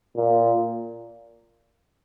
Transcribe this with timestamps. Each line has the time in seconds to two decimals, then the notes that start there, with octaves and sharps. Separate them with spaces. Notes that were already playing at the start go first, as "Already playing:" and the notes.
0.16 A#2